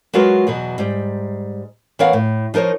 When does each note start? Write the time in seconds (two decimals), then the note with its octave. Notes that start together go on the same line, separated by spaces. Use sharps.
0.13 F#3 G#3 F4 F#4 A#4 B4
0.47 E2 B2 F#3
0.78 G#2 G3
1.99 E3 B3 A#4 C#5 F5 F#5
2.13 A2
2.54 F3 D#4 A#4 C5 C#5